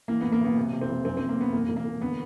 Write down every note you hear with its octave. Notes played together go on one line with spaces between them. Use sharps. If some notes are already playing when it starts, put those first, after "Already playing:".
E3 A#3
A2 B3
A#3
B1 B3
C3
C3
C4
F1
F#2 C4
F#2 C4
A#3
F#2 B3
E1 A#3
E1
A#3
E1
D3 B3